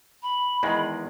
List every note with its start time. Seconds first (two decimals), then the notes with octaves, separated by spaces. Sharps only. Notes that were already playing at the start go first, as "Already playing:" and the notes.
0.23 B5
0.63 E2 D#3 G#3